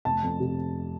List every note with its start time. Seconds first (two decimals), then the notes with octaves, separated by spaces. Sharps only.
0.05 F1 A5
0.23 F2
0.40 C3